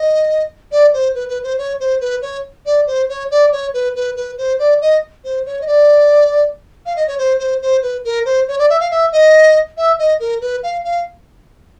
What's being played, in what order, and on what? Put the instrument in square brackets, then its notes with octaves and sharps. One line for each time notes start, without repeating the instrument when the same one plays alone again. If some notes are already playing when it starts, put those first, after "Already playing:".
Already playing: [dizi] D#5
D5
C5
B4
B4
C5
C#5
C5
B4
C#5
D5
C5
C#5
D5
C#5
B4
B4
B4
C5
D5
D#5
C5
C#5
D#5
D5
F5
D#5
C#5
C5
C5
C5
B4
A#4
C5
C#5
D5
E5
F5
E5
D#5
E5
D#5
A#4
B4
F5
F5